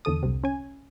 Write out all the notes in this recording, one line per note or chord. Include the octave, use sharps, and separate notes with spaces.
E2 D3 A4 D#6
C2 C3
C#4 G#5